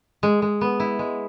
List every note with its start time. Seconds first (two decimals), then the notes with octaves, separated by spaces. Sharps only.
0.23 G#3
0.42 G#3
0.61 B3
0.80 E4
0.99 G#3